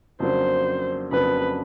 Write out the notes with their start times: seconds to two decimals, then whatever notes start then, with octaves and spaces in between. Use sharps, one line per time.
0.20 F2 C#3 F#3 A#3 D4 C5
1.12 F2 C#3 F#3 A#3 D4 B4